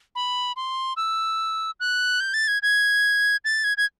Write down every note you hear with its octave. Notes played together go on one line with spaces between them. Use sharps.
B5
C6
E6
F#6
G6
A6
G#6
G#6
A6
G#6
G#6